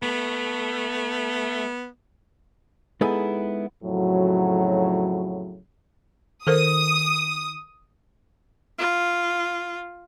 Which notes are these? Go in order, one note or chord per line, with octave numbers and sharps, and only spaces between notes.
A3 B3
G#3 B3 D#4 E4 G#4 A4
F2 A2 C#3 F#3
D#3 A4 A#4 C5 D#6
F4